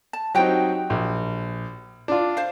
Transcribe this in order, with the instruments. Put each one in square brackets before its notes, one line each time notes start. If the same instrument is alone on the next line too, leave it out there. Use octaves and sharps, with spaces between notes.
[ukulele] A5
[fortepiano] F#3 C4 D#4 [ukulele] F#4 G4 G5
[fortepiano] A#1
D4 F4
[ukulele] C5 F5